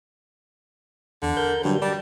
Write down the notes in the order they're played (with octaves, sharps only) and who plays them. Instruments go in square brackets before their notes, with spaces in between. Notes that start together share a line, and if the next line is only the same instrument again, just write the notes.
[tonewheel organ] E2 [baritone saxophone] D3
[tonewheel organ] A#4 G6
[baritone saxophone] G2 [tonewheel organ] D3 F#3 G3
[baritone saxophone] G3 [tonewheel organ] D5 A5